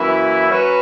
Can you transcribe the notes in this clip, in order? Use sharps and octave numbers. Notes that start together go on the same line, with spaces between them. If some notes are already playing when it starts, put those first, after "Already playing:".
Already playing: F#2 E3 A#3 E4
F#3 C#4 F#4 B4